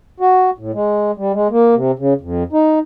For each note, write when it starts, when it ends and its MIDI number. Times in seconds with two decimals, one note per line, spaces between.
0.20 0.50 66
0.58 0.72 45
0.74 1.11 56
1.17 1.32 55
1.33 1.48 56
1.51 1.75 58
1.75 1.92 48
1.99 2.14 49
2.21 2.43 41
2.53 2.79 63